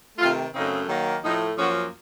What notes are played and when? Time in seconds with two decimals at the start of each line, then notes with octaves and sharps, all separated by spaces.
0.18 C3 D#3 A3 F4
0.54 F#2 C#3 A3 C4 D#4
0.88 D#3 F#3 A#3
1.23 A2 F3 A3 D#4
1.58 F#2 F3 A#3 C#4 F#4